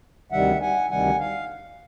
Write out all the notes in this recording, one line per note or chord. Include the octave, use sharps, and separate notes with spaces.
D2 C3 D#3 G3 E5 F#5
F#5 G#5
D2 C3 D#3 G3 F#5 G#5
F5